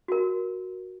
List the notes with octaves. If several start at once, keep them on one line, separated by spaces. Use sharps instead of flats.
F#4 A#4